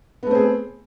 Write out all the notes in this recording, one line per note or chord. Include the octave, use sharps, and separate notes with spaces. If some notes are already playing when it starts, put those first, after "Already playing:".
A3 B3 C4 G#4